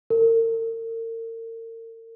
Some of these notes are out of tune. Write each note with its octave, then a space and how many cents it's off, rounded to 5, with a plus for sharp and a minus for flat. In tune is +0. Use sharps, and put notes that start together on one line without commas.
A#4 -40